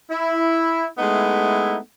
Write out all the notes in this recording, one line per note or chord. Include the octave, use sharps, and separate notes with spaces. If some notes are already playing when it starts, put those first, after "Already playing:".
E4
G#3 A3 B3 D#4 E4